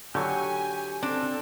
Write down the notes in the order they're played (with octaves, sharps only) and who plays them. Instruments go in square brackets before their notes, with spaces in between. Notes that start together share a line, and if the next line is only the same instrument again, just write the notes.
[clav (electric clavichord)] D3 F#3 [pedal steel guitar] G4 C#6 [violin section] G#5
[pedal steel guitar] C4 [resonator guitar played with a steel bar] D4 [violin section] A4